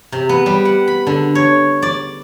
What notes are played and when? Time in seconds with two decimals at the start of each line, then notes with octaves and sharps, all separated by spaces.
0.12 C3
0.29 B3
0.46 G3
0.65 F#5
0.88 B5
1.07 D3
1.35 C#5
1.82 D5